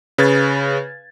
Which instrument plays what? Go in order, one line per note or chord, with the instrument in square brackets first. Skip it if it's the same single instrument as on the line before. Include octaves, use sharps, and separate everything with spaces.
[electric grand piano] C#3 B4 G#6 A6